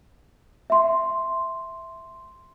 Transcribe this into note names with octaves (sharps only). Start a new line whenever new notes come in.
E5 C6